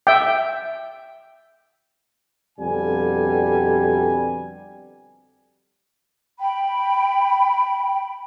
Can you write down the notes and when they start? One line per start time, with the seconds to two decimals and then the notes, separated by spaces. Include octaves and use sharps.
0.07 E5 G5
2.59 F2 B2 D3 G3 G#5
6.40 G5 B5